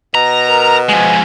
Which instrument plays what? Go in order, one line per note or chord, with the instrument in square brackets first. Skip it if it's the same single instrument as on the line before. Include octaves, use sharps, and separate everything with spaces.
[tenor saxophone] B2 [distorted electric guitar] A#5
[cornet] A#4
[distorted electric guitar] F3 G#3 [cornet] G#5